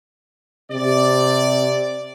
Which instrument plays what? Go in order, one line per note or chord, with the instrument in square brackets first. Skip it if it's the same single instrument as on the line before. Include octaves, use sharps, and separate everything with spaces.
[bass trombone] C3 [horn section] D5